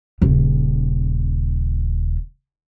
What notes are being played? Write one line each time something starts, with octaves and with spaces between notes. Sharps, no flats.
D#1 C#3